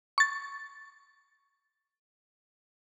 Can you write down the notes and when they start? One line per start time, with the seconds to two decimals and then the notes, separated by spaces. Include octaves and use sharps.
0.18 C#6 A6